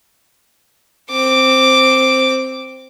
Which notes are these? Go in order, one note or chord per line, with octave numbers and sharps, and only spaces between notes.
C4 D6